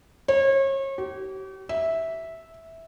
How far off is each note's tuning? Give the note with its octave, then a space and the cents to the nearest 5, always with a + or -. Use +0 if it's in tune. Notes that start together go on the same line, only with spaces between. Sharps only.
C#5 -35
G4 -40
E5 -10